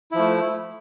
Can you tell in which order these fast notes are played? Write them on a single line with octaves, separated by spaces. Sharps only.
E4 F3 A3